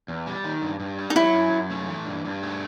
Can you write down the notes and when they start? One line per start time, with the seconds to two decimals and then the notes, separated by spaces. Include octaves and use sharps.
0.08 E2
0.27 G3
0.44 D#3
0.62 G2
0.80 G2
0.99 G3
1.10 D#4
1.16 F#3 E4
1.34 F#2
1.52 F#2
1.70 A3
1.89 E3
2.06 G2
2.25 G2
2.42 A3